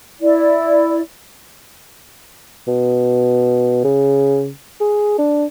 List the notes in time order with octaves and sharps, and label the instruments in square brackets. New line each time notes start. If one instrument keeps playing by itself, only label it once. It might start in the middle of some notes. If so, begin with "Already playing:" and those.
[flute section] E4 D5
[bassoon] B2
C#3
G#4
D4